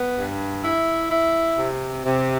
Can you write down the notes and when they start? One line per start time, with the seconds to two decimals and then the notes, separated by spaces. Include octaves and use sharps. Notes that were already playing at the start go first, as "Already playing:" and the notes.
Already playing: B3
0.17 G2
0.64 E4
1.11 E4
1.58 C3
2.05 C3